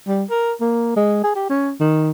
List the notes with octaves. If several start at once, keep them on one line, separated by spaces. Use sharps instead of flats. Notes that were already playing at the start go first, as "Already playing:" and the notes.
G3
A#4
A#3
G#3
G#4
G4
C#4
D#3